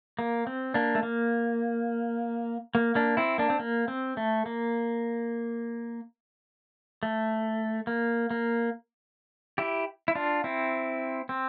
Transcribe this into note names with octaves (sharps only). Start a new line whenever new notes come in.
A#3
C4
A#3 D4
A3
A#3
A#3
A#3 D4
C4 E4
A#3 D4
C4
A#3
C4
A3
A#3
A3
A#3
A#3
E4 G4
E4
D4 F4
C4 E4
C4